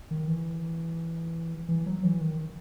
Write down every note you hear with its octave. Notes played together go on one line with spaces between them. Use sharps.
D#3
E3
E3
F#3
E3
D#3